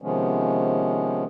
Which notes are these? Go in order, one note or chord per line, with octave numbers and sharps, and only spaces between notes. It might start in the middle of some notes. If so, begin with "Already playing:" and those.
C3 D#3 F3 G#3 B3 C#4